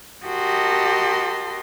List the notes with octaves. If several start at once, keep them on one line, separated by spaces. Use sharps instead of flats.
F#4 G4 A#4 D#5 A5 C6